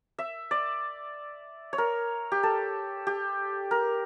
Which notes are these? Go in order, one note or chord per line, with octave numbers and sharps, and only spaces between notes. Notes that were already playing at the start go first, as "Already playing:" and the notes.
E5
D5
C#5
A#4
G4
A4
G4
A#4